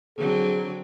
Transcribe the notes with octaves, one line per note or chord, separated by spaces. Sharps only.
D3 F#3 C4 G#4